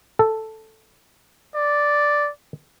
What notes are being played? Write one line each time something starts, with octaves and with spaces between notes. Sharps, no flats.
A4
D5